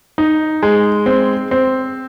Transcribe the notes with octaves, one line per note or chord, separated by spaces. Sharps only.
D#4
G#3
C4
C4